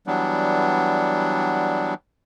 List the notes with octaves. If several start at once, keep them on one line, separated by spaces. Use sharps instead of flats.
E3 F#3 G3 B3 D4